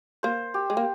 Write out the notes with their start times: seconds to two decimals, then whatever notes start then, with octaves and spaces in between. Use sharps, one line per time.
0.23 A#3 C5
0.54 G4
0.70 G#3
0.77 A#3